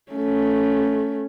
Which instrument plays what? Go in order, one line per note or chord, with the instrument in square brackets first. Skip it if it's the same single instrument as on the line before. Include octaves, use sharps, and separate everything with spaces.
[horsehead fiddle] A3 C#4